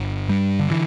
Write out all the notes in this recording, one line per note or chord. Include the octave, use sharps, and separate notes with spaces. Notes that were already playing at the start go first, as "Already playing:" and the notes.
Already playing: G1
G2 G3
D3
D3 E3